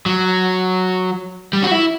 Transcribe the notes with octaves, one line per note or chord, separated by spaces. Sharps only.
F#3
G3
F#4
E4